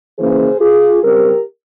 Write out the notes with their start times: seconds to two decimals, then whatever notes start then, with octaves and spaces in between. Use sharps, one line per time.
0.18 C#3 E3 A#3 C#4 G#4 C5
0.60 F4 G#4
1.02 C#3 G3 C4 G4 A#4